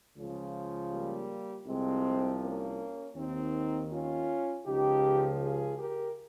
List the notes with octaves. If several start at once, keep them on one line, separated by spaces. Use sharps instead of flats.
C#2 C#3 F3
G3 A#3
C2 C3 F3 G#3 C4
A#3 C#4
D#2 D#3 C4 D#4
C#4 F4
C#2 C#3 F3 D#4 G4
F4 G#4
G4 A#4